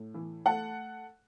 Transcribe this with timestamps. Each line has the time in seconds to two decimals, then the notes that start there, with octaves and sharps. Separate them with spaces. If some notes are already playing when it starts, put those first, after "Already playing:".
Already playing: A2
0.14 E3
0.46 A3 F#5 A5